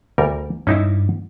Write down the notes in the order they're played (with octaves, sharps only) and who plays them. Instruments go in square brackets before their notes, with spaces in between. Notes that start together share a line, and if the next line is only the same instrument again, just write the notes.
[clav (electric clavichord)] D2 G3 A#4
[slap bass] G2 G3 [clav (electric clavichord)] C#4 D#4 E4